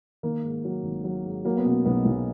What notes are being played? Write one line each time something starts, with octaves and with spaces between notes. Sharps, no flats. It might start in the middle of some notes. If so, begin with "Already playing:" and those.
D#3 A#3
G#2
F#3
G#1
F#3
G#2
F#3 A#3
B3
B2 C#4
B1 B3
B1